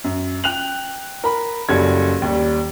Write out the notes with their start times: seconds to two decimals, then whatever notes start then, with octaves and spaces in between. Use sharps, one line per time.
0.04 F#2
0.44 G5 F#6 F7 F#7
1.24 A#4 B5
1.69 F#1 F#3 G3 C#4 A4 G#6
2.22 D#2 G3